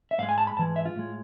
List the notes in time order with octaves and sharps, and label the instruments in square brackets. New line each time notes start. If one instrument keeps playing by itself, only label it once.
[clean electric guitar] E5
G#2 F5
G#3
G#5
A5
B5
G#2 E3 G#3 A5
E5
F4
A2 G#3